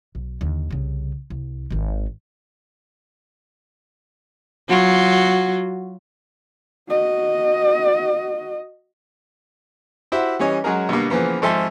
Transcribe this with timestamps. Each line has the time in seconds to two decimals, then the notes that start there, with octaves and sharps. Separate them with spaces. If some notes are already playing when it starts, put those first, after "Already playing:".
0.15 B1
0.41 D#2 D3
0.71 C2 C#3
1.30 C2
1.71 G#1 D#3
4.69 F#3 F4 F#4
6.89 F#4 D#5
10.12 E4 F#4 G4 C5 E5
10.39 E3 G3 C#4 C#5 D#5
10.64 F#3 G#3 C#4 F#4 G#4 A#4
10.89 B2 D3 G3 A#3
11.10 C#3 E3 F3 A#3 B3
11.42 G#1 F3 A4 E5 G#5 C6